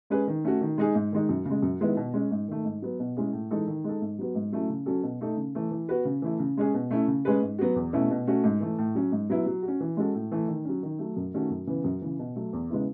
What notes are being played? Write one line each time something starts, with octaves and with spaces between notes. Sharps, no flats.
G#3 C#4 G#4 B4
D#3
A3 C#4 F#4
D#3
G#3 D#4 G#4
G#2
D#3 G#3 D#4
F#2
C#3 G#3
F#2
D#3 G#3 B3 E4
B2
G#3 C#4
G#2
D#3 A3
G#2
F#3 B3
B2
G#3 C#4 E4 G#4
A2
E3 G#3 D#4 A4
D#3
G#3 D#4 A4
G#2
F#3 B3 F#4
G#2
F#3 A3 C#4 E4
C#3
F#3 C#4 F#4 A4
B2
A3 D#4 A4
C#3
E3 A3
E3
B3 F#4 B4
C#3
E3 A3 E4
C#3
G#3 C#4 G#4
B2
A3 C#4 E4
C#3
G#3 C#4 G#4 B4
G#2
F#3 B3 F#4
E2
B2 A3 C#4 E4
B2
A3 C#4 F#4
G#2
E3 A3
A2
F#3 C#4
G#2
F#3 B3 E4
F#3
F#4
C#4
E3
G#3 C#4 F#4 A4
A2
E3 A3
D#3
F#3 C#4
D#3
F#3 A3
F#2
D#3 A3 C#4 F#4
F#2
C#3 E3 B3
F#2
C#3 E3
B2
F#3 A3
E2
C#3 G#3 B3 E4